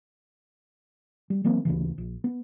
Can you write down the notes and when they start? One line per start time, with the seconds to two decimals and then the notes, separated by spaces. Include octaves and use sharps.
1.30 G3
1.44 E3 F#3 A#3 C4
1.65 D2 C#3 E3
1.98 A#1
2.24 B3